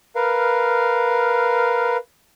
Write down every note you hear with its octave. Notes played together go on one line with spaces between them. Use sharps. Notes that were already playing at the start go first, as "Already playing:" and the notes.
A#4 B4 F5